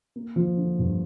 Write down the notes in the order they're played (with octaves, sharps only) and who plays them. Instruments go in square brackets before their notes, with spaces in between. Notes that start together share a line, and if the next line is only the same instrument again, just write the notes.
[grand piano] A#3
F3
D3
G2